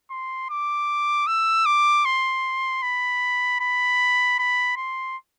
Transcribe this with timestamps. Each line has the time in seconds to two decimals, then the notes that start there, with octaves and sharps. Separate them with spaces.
0.11 C6
0.50 D6
1.27 E6
1.66 D6
2.06 C6
2.82 B5
3.60 B5
4.39 B5
4.77 C6